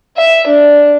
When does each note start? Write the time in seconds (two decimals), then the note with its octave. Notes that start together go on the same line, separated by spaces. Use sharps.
0.17 E5
0.47 D4